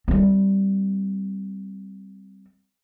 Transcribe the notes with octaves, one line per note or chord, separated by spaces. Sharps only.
G3 C4